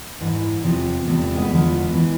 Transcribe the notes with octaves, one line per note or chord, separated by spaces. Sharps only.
G#2 E3
E2 C3 F3
E2 C3 F3 A3
A3
G#3 B3
E2 D3 F3
E3